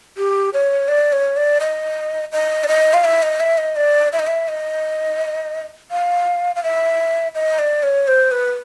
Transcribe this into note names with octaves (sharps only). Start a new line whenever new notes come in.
G4
C#5
D5
C#5
D5
D#5
D#5
D5
D#5
F5
E5
D#5
E5
D#5
D5
E5
D#5
E5
D#5
F5
F5
E5
D#5
D5
C#5
C5
B4